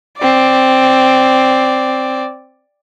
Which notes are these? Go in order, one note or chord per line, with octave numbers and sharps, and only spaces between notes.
C4 D5